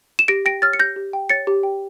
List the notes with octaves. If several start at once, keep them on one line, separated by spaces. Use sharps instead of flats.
E7
G4 A#6 D7
G5 A#6 D7
C#5 F6 A6
C#7
G4 G6 A#6
G4
G5
C#5 A6 C#7
G4
G5